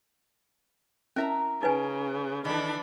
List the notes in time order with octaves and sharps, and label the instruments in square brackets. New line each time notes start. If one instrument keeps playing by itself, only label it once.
[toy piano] C#4 E4 [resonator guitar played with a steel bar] A#4 E5 A#5
[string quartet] C#3 [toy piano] D#4 B4 G#5
[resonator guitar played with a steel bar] D#3 A4 [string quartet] E3 D4 B5